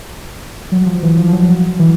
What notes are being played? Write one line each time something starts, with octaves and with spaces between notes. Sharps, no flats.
F#3
F3
E3
F3
F3
F#3
F#3
E3